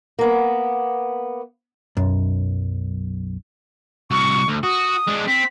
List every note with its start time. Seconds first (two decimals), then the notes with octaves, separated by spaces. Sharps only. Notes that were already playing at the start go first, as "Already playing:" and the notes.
0.19 A#3 B3
1.97 B1 F#2
4.11 C2 F#4 C#6
4.48 D2
4.63 F#4 D#6
5.08 G#3 D4
5.28 C4 B6